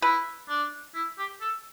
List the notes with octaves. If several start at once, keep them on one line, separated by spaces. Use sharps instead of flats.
E4 B4
D4
E4
G4
A4